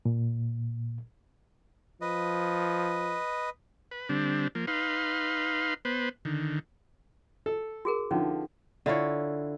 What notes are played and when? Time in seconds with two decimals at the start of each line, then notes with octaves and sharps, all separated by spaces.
0.05 A#2
2.01 F3 B4 D#5
3.91 B4
4.09 D3 G3 C4 D4
4.55 F3 A#3
4.67 D#4 B4 F5 C6
5.85 B3 B4 C5
6.25 D3 D#3
7.46 A4
7.85 F#4 G#4 A#4
8.11 D3 F3 C#4 D#4
8.86 D3 E4 F4 C#5